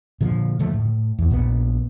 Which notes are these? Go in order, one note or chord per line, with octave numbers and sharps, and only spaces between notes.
A#2 D3 F3
D3 F3 A3
A2
E2
A#1 A#2 D#3 B3